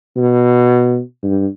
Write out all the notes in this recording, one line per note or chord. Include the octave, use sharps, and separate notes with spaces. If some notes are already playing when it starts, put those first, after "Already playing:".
B2
G2